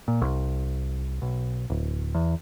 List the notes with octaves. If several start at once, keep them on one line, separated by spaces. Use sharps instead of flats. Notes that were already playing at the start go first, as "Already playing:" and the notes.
A#2
C2
B1
D1
E2